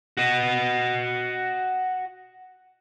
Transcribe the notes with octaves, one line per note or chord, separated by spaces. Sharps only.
F#4 D#5